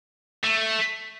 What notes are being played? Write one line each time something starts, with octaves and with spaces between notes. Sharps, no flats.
A3